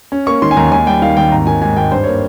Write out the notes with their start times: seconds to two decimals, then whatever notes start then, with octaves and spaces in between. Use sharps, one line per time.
0.12 C#4
0.27 A#3 C#6
0.42 D#3 C6
0.51 G#5
0.57 D#2 A#5
0.72 D#2 G#5
0.87 G3 G5
1.02 D#3 F5
1.17 D#2 G5
1.32 G#1 A#5
1.47 D#3 G#5
1.61 G#2 G#5
1.77 G#1 G5
1.92 G2 C5
2.04 A#3 C#5